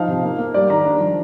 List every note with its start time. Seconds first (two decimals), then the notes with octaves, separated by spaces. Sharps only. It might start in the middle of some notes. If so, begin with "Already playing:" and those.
Already playing: F3 D#4 F5
0.08 C3
0.23 A#3
0.38 A#3
0.54 G3 D5
0.70 D#3 A#5
0.85 D4
1.00 F3